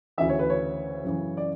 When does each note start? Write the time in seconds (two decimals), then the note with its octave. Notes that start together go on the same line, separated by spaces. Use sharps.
0.18 D2 C#3 E3 E5
0.29 C#5
0.39 B4
0.50 C#5
1.04 F#2 C#3 E3
1.37 D5